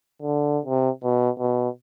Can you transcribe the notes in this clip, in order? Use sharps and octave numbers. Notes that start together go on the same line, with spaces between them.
D3
C3
B2
B2